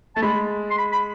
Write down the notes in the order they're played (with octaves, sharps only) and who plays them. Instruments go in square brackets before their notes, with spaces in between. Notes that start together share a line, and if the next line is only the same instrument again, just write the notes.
[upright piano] A3 [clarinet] A5
[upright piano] G#3 [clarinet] B5
[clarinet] C6
B5
B5